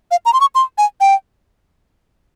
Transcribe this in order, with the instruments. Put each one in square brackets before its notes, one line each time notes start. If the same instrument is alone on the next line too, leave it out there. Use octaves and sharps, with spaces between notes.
[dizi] F5
A#5
C6
C#6
C6
G#5
G5